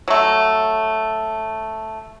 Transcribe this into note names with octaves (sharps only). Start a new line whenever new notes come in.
F#3 A3